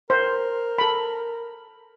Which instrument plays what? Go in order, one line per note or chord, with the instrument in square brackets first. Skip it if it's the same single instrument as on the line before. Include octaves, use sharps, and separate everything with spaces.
[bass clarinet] A#4 [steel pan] C5
[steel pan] A4 B5